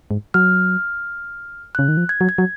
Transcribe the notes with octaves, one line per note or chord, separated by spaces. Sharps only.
G#2
F#3 F6
C#3 F#6
D#3
F3
G#6
F#3
G#6
F#3